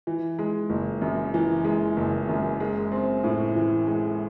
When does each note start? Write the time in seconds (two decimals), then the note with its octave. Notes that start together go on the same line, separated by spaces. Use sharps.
0.07 E3
0.39 G#3
0.70 F#1
1.02 F#2
1.34 E3
1.65 G#3
1.97 F#1
2.29 F#2
2.60 G#3
2.92 C4
3.24 A2
3.56 E3
3.87 G#3